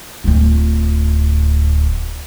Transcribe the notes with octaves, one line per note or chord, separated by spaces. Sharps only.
D1 F4